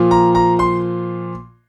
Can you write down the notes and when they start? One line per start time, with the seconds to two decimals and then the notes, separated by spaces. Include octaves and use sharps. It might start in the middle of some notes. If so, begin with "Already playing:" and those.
Already playing: A#2 F3
0.11 A#5
0.35 A#5
0.59 C6